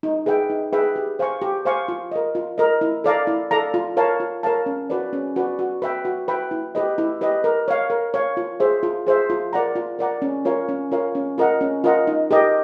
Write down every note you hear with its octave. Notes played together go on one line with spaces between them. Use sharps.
D#4
G#4 B4 E5 G5
D#4
G#4 B4 E5 G5
G4
C5 F5 G#5 C#6
G4
C5 F5 G#5 C#6
F4
A#4 D#5
F4
A#4 D#5
E4
A4 D5 F5 A#5
E4
A4 D5 F5 A#5
F4
A#4 C#5 F5 A5
F4
A#4 C#5 F5 A5
C#4
F#4 B4 D5
C#4
F#4 B4 D5
F#4
B4 E5 G5 B5
F#4
B4 E5 G5 B5
E4
G4 B4 D#5
E4
G4 B4 D#5
A#4
C#5 F5
A#4
C#5 F5
F4
G#4 C5 E5
F4
G#4 C5 E5
F4
A#4 D5 F#5 A#5
F4
A#4 D5 F#5 A#5
C#4
F4 A#4 C#5 F5
C#4
F4 A#4 C#5 F5
C#4
F4 A#4 D#5 F#5
C#4
F4 A#4 D#5 F#5
D#4
G4 A#4 D#5